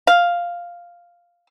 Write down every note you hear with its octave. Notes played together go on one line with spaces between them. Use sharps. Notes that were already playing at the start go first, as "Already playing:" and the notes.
F5